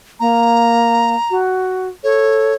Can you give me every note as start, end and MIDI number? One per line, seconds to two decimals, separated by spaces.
0.20 1.15 58
0.20 1.36 82
1.31 1.88 66
2.04 2.53 69
2.04 2.55 73